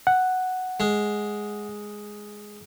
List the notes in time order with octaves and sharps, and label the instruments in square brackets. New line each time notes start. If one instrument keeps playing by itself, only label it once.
[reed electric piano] F#5
[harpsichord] G#3